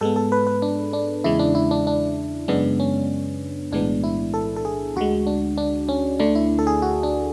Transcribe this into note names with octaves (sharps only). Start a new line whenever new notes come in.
G#2 G#3 B3 A4
A4
B4
B4
D4
D4
E2 C#3 G#3 E4
D4
E4
D4
D4
F#2 C#3 G#3 B3 D4
C#4
B1 A2 E3 G#3 B3 D4
E4
A4
A4
G#4
D2 D3 G#3 F#4
D4
D4
C#4
D2 D3 A3 D4
E4
A4
G#4
F#4
D4